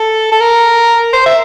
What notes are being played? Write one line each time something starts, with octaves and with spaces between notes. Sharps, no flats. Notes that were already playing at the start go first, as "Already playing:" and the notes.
Already playing: A4
A4
A#4
C5
E5